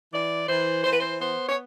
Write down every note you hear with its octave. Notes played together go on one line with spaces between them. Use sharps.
E3 D5
E3 C5
E3 C5
B4
C5
B3 C5
C#5